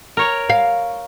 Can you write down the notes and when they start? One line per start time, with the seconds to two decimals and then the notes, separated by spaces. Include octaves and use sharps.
0.17 A#4 C#5
0.49 F5